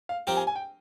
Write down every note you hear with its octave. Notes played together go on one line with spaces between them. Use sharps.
F5
F3 C4 G4 A#4 G5
G#5
G#5
G5